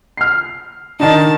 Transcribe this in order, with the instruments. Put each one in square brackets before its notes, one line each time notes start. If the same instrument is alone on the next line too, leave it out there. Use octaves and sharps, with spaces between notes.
[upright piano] F6 C7
[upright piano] D#3 D4 D#4 [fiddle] A5